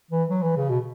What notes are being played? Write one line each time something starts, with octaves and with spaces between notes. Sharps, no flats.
E3
F#3
E3
C#3
B2